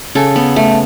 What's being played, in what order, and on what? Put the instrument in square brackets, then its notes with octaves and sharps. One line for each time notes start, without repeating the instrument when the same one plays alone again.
[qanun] C#3 A4
B3
A3